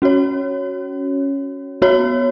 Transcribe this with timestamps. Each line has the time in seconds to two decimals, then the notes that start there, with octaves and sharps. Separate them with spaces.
0.02 C#4 F#4 C#5
1.82 B3 F#4 C#5